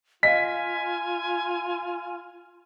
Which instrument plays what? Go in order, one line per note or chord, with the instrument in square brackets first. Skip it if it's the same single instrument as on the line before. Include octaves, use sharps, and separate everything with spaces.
[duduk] F4 [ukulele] D#5 F5 [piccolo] G#5 [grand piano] B6